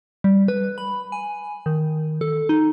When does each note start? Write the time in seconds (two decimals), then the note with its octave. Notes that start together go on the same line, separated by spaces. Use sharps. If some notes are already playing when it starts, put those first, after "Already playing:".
0.24 G3
0.48 B4
0.78 B5
1.12 G#5
1.66 D#3
2.21 A4
2.49 D#4